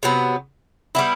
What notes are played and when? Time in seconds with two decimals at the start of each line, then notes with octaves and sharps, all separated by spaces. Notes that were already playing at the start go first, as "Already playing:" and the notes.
0.03 C3 F#3 B3
0.95 G3 B3 E4